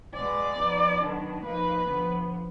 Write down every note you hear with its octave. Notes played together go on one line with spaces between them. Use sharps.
B2 G#3 B3 D5
F3 B3 D#4
D#3 F#3 B3 D4
F3 A#3 D#4 B4
D3 F3 B3